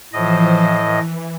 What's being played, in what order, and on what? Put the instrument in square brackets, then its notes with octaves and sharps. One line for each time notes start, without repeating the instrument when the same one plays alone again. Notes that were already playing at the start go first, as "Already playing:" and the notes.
[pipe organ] A2 D#5 [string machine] E3 F3 C5
[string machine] E3